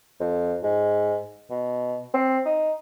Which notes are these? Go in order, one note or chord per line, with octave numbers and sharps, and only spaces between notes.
F2
G#2
B2
C4
D#4